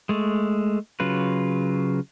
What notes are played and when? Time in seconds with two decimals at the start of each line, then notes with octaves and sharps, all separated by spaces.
0.09 G#3 A3
1.00 C#3 F#3 F4 B4